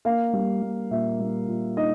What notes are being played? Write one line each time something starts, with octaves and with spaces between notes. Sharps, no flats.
A#3 F5
G3
G3
A#2 E5
G3
A#2
D#4 D#5